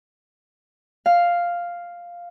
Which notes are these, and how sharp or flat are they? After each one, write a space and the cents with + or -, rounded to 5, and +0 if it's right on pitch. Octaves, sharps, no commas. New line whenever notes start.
F5 +0